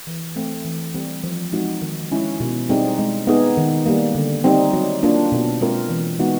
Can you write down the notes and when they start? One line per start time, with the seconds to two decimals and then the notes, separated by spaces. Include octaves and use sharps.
0.07 E3
0.36 A3 C4
0.64 E3
0.95 G3 C4
1.24 F3
1.53 G#3 C4 D#4 F#4
1.82 D#3
2.11 G#3 C#4 E4
2.40 B2
2.69 G3 C4 D#4 G#4
2.98 G#3
3.27 B3 D#4 G#4
3.57 D#3
3.86 G3 A#3
4.15 D3
4.44 G3 C4 D#4
4.73 F#3
5.03 A#3 D4 F4
5.32 B2
5.61 G#3 C4 F4 A#4
5.89 E3
6.19 G#3 B3 D#4 F#4